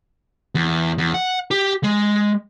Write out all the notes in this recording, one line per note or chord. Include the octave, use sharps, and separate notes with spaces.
E2
E2
F#5
G4
G#3